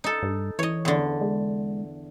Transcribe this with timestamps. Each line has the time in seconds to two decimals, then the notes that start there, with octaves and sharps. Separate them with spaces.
0.04 D#4 A4
0.22 G2
0.59 E3 C#5 D#5
0.85 E2 D3
1.21 G#3